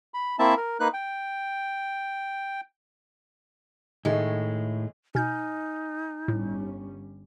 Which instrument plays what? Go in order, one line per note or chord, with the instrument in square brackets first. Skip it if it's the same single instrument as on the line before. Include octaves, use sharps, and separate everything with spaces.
[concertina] B5
A#3 C4 E4 E5 A5
A#4
A#3 D#4 B4 F#6
G5
[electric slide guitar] A2 [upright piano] D#3 A3 [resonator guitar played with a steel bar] G#3
[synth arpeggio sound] B2 G6 [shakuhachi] D#4 [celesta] G#5 F6
[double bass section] G1 G3 C#4 [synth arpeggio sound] A2